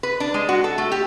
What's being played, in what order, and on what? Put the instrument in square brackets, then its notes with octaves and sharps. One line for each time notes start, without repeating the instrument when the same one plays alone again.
[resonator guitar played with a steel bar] B4
D4
G#3
F#4
A4
A3
G4